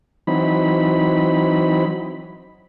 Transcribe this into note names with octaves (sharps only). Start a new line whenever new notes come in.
E3 F#3 C4 D#4 B5